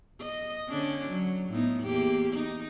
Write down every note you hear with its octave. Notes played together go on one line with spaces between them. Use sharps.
D#5
D3 C#4 D4
F#3
A2 B3 D#4
E2 A#3 G4
D#4